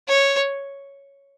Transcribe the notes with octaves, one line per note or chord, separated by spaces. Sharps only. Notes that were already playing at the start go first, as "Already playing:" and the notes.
C#5